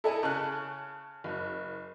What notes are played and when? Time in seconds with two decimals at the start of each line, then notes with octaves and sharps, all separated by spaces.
0.04 E4 A4 A#4 D#5 G#5
0.23 C#3 G#5 A5 C#6 F#6
1.24 F#1